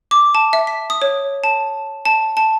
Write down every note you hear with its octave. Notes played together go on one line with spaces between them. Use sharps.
D6
A5
E5
B6
D#6
C#5
A5
A5
A5